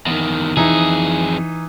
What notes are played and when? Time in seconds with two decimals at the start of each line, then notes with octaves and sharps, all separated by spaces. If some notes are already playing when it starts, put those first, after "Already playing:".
0.07 E2 D#3
0.57 F2 E3 D#4 G#4